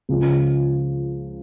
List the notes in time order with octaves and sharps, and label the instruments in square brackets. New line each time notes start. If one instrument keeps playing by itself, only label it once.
[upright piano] C#2 C#3 F3